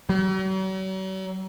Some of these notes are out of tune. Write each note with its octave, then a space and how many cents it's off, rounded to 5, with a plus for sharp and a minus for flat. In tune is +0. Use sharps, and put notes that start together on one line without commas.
F#3 +45